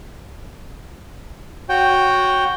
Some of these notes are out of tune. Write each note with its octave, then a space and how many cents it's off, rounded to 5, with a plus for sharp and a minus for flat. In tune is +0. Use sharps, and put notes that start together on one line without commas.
F#4 +0 C#5 +0 G5 +0